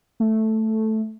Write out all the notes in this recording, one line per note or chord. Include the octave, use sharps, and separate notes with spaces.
A3